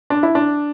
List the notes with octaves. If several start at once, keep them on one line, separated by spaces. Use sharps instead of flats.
D4
E4
D4